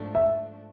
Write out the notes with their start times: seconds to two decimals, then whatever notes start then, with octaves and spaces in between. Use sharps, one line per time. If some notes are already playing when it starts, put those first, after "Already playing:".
Already playing: G#2 F3 A3 D4
0.15 E5